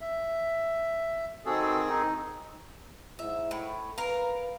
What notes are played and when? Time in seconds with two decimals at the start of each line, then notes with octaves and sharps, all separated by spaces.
0.01 E5
1.46 D#3 C4 F#4 G#4 A4
1.90 D#4
3.19 G#2 E4 E5
3.51 A2
3.98 A#4 B4 F5